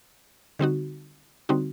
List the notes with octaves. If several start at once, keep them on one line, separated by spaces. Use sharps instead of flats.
D3 G3 C4 D#4 F#4
D3 G3 C4 D#4 F#4